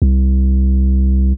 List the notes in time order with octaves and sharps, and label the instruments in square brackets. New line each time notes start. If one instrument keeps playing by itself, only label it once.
[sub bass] C2